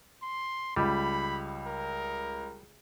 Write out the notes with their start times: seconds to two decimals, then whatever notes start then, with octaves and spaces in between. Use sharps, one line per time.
0.22 C6
0.76 C#2 G3 B5
1.67 A#4